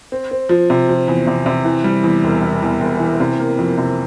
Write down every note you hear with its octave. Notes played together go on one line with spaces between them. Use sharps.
C4
C4
F3
C3
F3
E2
C3
C3
E3
G3
E2
E1
E1
E2
E1
E3
C3
A#3
F2
C3